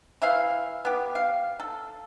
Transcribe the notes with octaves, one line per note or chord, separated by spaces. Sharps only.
E3 E5 F5
B3 G4
F5
A4